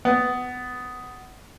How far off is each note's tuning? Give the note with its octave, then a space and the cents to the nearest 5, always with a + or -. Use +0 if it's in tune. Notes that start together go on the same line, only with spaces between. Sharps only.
B3 +15